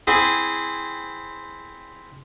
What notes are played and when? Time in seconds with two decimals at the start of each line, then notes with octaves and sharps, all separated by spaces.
0.07 C4 E4 G#4